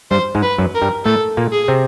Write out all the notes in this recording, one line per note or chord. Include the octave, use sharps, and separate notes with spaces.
G2 G3 C5
G#2 G#3
B4
F#2 F#3
A#4
G2 G3
A2 A3 A4
A#2 A#3
G#4
C3 C4